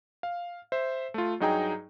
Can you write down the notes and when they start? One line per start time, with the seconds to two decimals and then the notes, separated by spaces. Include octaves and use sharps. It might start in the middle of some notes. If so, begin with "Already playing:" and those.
0.23 F5
0.72 C5 E5
1.14 A3 F4
1.40 G2 F#3 D#4 G#4 G5 A#5